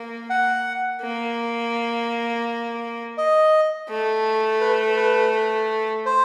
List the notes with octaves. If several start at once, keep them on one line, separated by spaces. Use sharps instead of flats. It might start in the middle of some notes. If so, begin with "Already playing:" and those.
Already playing: A#3
F#5
A#3
D#5
A3
B4
B4
C5